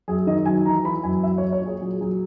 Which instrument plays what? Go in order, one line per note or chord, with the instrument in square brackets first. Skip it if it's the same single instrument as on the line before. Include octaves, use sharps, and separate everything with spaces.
[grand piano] F#2 G#4
D#3 D#5
F#3 G#5
E3 A#5
E3 B5
F#2 G#5
F#3 E5
C#5
F#3
C#5
A#2 G#4
F#3 G#4
F#3 G#4